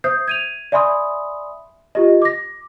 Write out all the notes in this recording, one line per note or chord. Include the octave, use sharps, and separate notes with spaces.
C5 E5 D#6 G6 C7
G#6 D#7 F7
D5 E5 G#5 B5 C6 D#6
F4 G4 D#5
D6 A#6